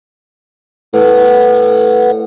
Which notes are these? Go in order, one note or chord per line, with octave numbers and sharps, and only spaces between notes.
A2 B4 F#5